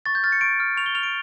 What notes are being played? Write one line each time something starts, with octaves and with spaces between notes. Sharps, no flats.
C#6 A6
G6
F6 A6
C#7
C#6 D7
F6
C#6 F7
G7
F6 F7
D7